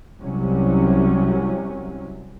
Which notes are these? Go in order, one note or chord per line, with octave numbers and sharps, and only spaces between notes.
C2 C3 F#3 C#4